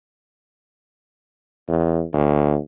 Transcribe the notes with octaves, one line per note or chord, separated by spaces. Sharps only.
E2
D2